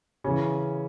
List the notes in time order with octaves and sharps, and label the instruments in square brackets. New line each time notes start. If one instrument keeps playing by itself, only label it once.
[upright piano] C#3 E3 C#4